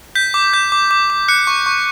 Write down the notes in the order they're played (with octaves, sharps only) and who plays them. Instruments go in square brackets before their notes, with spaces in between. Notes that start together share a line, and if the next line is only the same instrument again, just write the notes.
[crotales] G6 B6
D6
G6
D6
D6
D6
F#6 C#7
C#6
C#6